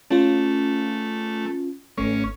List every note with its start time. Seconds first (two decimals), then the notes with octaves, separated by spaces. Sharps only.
0.11 A3 C#4 F4
1.98 G#1 A3 C#4